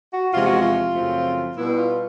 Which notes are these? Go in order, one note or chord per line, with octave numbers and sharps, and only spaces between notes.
F#4
E2 C3 F3 G#3 F4
F#4
F4
F#2 C#3 F3 A3 C4
B2 G3 B3 E4
F4